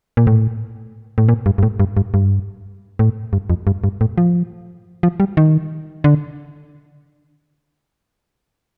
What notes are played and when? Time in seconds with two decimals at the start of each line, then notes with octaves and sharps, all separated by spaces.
0.17 A#2
0.27 A2
1.18 A2
1.29 A#2
1.46 G2
1.58 G2
1.63 A2
1.80 G2
1.97 G2
2.14 G2
2.99 A2
3.33 G2
3.50 F2
3.67 G2
3.84 G2
4.01 A2
4.18 F3
5.03 F3
5.20 G3
5.37 D#3
6.04 D3